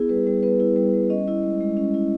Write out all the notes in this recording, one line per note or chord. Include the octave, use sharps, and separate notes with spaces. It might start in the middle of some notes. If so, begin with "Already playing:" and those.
Already playing: B3 E4 G#4
G3 B4
G3
B3 B4
E4
G3
G3
C#4 D#5
E4
G#3
G#3
C#4
E4